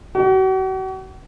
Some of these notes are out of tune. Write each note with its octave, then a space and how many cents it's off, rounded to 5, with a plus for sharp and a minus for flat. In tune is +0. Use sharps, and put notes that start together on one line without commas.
F#4 +40